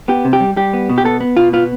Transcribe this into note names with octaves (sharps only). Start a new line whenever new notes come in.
B3 G4
C3
G4
G3
G3 G4
B3
B2
G4
B3 A4
B3
B2 F4
B3 F4